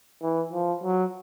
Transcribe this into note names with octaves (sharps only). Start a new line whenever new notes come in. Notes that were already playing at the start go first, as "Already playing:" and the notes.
E3
F3
F#3